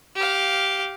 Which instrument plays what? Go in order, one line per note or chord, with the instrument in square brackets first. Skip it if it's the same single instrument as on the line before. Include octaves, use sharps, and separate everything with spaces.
[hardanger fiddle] G4 F5